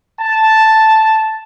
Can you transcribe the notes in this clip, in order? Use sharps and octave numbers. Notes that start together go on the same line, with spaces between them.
A5